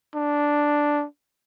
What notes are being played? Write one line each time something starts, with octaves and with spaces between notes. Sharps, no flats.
D4